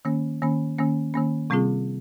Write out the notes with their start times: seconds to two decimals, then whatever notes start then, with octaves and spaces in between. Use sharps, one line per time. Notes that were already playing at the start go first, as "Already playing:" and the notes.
0.05 D#3 A#3 C#4
0.42 D#3 A#3 C#4
0.78 D#3 A#3 C#4
1.14 D#3 A#3 C#4
1.50 C3 G3 C4 F4 G#4